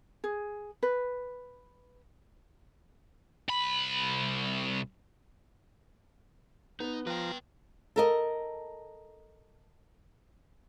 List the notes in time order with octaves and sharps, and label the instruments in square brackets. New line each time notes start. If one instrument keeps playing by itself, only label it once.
[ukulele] G#4
B4
[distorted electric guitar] C2 B5
[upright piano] B3 [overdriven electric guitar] D#4
[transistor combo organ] F3 A#5 [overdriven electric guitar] B4 G5
[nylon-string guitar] A4 A#4 D#5